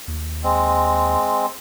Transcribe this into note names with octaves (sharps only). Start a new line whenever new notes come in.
D#2
G#3 C4